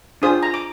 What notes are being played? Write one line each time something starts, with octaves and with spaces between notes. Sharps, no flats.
D4 F4 G#4 C5 D#6
A#5
D6